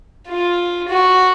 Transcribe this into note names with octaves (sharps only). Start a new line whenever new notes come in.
F4
F#4